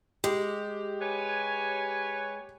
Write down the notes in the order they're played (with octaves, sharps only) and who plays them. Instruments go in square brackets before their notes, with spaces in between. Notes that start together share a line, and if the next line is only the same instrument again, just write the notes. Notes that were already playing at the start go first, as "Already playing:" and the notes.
[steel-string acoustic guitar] G#3 [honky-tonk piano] G4
[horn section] B4 C#5 G#5